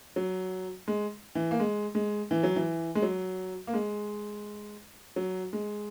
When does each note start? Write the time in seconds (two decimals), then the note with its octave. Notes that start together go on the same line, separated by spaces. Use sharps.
0.16 F#3
0.88 G#3
1.35 E3
1.51 A#3
1.60 G#3
1.95 G#3
2.31 E3
2.43 F#3
2.56 E3
2.95 G#3
3.02 F#3
3.67 A#3
3.74 G#3
5.16 F#3
5.53 G#3